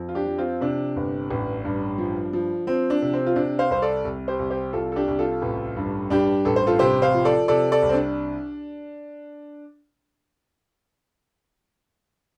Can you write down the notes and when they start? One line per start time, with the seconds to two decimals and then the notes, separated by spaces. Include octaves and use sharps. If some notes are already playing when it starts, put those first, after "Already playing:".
Already playing: F2
0.09 F4
0.15 D4 G4
0.26 F3
0.38 C4 F4
0.61 C3 D4
0.96 G1
1.30 A1
1.65 G2
1.98 F3
2.33 F3
2.67 F3 C4
2.90 D4
3.02 C3
3.13 C4
3.26 F4
3.36 C3 D4
3.59 C5 F5
3.70 C2 C5
3.82 A4 D5
4.04 C2
4.28 G4 C5
4.39 C2
4.50 G4 C5
4.73 C2 F4 A4
4.92 A4
4.96 D4 G4
5.08 C2
5.19 F4 A4
5.42 A1
5.77 G2
6.10 G2 D4 G4
6.45 A1 A4
6.56 C5
6.67 F4 A4
6.79 C3 G4 C5
7.02 C5 F5
7.14 F3
7.25 A4 D5
7.48 C3 A4 D5
7.72 A4 D5
7.82 C2
7.89 C4
7.94 D4